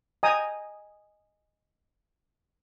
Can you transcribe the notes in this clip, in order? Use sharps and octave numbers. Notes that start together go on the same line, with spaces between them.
D#5 G5 G#5 A#5 D#6